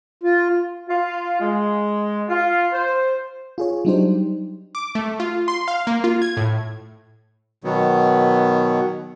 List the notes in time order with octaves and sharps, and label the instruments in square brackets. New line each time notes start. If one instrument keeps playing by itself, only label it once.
[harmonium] F4
[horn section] F4
G#3
F4
C5
[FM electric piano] F4 G#4 C#5
F#3 G3 D4 D#4 G4 C5
[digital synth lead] D6
A3
F4
C6
F5
A#3
F4
G#6
A2
[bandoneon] B2 D#3 F#3 B3